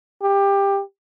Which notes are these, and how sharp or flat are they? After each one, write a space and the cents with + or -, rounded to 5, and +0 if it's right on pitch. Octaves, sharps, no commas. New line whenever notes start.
G4 +20